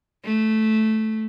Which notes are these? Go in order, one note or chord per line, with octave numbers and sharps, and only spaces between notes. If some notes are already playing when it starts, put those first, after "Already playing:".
A3